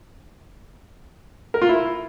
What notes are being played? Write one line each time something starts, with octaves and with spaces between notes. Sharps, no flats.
A#4
F4
E4